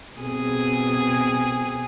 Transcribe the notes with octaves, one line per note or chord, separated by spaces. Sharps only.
B2 C4 G#4